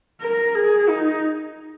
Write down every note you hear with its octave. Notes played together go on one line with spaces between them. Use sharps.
A#4
G#4
D#4